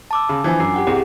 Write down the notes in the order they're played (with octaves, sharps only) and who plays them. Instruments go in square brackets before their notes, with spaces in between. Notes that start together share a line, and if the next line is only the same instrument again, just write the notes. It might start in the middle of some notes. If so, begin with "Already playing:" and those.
[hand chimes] A5 D6 E6
[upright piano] C#3 [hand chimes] D6
[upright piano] E3 F3 [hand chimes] D4 F4 G#5
[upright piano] F#2 [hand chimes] D6 C7
[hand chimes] G4 F#5 G5
[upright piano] C2 [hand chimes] G4 G#4